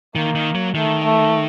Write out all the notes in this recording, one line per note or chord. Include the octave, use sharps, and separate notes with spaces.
D#3 A#3
D#3
F#3
D#3 A3
A3